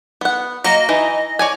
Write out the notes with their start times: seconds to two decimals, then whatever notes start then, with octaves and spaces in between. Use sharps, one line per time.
0.21 B3 F#5
0.64 F#3 A#3 D#5
0.89 E3 D#4
1.39 C#5 D5 G#5